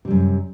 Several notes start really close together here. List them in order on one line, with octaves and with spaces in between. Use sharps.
C3 G3 F#2